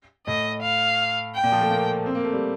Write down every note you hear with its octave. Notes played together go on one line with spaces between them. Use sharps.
A2 D#5
F5
G5
A#2
F3
A3
A#3
C4
A#3
A3
G3